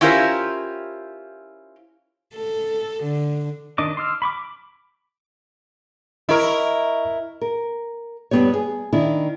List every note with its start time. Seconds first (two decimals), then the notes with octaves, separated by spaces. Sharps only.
0.01 C#4 E4 F4 G4 A#4 C5
2.34 A4
3.03 D3
3.78 D#3 D4 D#5 D6
3.97 C6 D6 E6 F6
4.22 B5 C#6 D6
4.33 D6
6.29 E4 A#4 D#5 C#6
7.41 A#4
8.31 G2 C#3 B3 G4 C#5
8.54 G#4
8.93 D#3 D4 E4